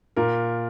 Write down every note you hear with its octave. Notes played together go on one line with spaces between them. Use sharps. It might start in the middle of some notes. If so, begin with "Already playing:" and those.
A#2 A#4